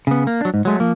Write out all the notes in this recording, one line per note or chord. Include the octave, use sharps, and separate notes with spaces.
C#3 B3
A#3
F#3 D4
G#2
F#3 G#3 A3
F3 A#3